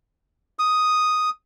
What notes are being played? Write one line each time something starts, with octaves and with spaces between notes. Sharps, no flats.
D#6